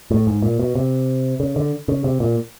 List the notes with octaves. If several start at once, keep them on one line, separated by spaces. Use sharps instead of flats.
A2
G#2
A#2
B2
C3
C#3
D3
C#3
C3
A#2